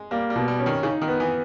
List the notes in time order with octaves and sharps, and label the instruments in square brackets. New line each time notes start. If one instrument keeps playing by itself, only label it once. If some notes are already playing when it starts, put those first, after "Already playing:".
Already playing: [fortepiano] G#3
[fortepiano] G3 [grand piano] A#3
[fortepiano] G3
[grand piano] B2
[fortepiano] G3
[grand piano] C#4
[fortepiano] D#3
[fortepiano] C#3 [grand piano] D#4
[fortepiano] D#3
[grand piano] B3
[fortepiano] E3